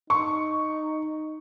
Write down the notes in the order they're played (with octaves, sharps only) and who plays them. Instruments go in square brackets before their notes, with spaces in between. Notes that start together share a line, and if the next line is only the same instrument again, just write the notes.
[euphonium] D#4 [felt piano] C#6